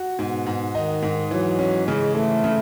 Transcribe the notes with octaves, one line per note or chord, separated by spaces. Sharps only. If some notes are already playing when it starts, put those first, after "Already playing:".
Already playing: F#4
G#2 B2
G#2
D#3 D#4
G#2
E3 F#3
C#4
C#3 G#3
E3 A3
C#3